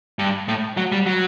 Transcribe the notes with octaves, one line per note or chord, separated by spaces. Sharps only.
G2
A2
F#3
G3
F#3